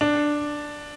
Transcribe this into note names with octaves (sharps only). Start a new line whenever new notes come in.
D4